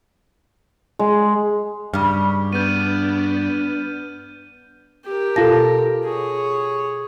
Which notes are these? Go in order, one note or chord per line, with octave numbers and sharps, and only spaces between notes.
G#3
G2 C#3 G3 F6
B3 D4 G6 D#7
G4 A#4
B2 F4 A4 F5 A5 A#6
G#4 C#5